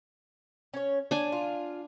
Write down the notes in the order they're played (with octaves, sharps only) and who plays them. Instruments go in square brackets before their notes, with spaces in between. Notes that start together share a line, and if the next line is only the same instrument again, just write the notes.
[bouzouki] C#4 C#5
[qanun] D4 G#5 [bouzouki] C#5
[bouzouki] F4